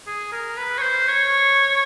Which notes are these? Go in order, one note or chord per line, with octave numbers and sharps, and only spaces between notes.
G#4
A#4
B4
C#5
C5
C#5